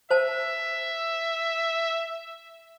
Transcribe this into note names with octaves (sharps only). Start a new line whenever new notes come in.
C5 E5 A5